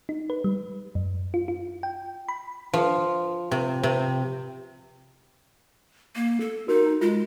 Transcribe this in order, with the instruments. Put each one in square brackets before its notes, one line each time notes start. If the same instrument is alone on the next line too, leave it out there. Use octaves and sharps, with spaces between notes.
[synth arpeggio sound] D#4
B4
G3
F#2
F4
F4
G5
B5
[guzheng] F3
C3
C3
[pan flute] A#3
A4
[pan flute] D#4 [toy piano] F#4 A#4
[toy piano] A#5
[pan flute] G#3 [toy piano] F4